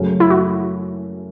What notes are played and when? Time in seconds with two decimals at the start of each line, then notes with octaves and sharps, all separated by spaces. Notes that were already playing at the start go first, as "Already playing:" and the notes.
Already playing: F#2 C#3 F#3 A3 C#4
0.20 E4
0.30 F#4